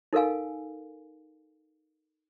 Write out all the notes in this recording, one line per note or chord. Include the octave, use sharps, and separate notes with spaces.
D#4 A4 A#4 F5 G#5